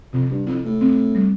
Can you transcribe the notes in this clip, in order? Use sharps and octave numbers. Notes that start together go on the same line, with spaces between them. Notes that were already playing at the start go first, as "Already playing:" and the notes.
F2 C3
G2
F2 E4
A2
C4
G3